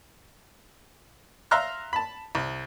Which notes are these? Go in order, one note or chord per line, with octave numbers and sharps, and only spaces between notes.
E5 F5 A#5 C6 F6 F#6
A5 B5
C2